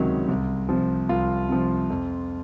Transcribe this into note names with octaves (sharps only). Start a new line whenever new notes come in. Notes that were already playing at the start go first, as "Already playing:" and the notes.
Already playing: C#2 C3 D#3 F#3 C#4
C2
C3 F3
C2 F4
C3 F3
F2